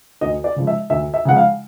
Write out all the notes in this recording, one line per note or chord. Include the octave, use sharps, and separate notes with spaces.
D2 D#5
D5
C#3 F3 G#3
E5
D2 E5
E5
C#3 F3 G#3 F#5
F5